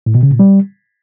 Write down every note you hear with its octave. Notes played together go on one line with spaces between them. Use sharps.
A2
B2
C#3
A#2
G3